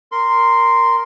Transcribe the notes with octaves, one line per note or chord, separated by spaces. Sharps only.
A#4 C6